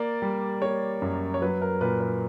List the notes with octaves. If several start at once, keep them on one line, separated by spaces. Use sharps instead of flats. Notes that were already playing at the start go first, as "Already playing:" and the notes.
Already playing: A#3 D5
G3
A#3 C#5
F#2
C#5
F#3 B4
A#4
A#2 B4
B4